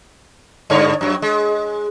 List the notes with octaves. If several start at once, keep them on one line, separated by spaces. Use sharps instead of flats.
G2 D3 C#5
F#2 F#3
G#3